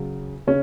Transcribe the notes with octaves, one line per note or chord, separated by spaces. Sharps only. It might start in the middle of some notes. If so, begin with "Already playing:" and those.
Already playing: C#3 F#3
C#3 C#4